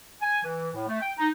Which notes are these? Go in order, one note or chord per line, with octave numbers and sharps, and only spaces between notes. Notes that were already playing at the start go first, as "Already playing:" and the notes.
G#5
E3
A2
A3
G5
D#4